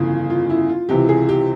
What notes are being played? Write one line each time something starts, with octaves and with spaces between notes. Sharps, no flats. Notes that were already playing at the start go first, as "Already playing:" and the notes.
Already playing: G1 F2 C#3 E3
F4
E4
F4
C#2 C3 E3 G4
G#4
G4